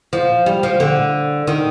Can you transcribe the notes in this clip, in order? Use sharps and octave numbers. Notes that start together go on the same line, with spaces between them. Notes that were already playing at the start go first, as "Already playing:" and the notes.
F3
G3
F3
D3
D#3